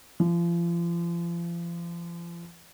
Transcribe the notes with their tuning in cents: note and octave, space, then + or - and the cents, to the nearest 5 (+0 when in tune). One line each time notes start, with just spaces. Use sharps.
F3 -35